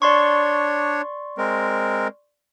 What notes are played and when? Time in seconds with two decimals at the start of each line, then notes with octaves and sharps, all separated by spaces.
0.02 D4 C#5 D5 C6 C#6
1.38 G#3 C4 A#4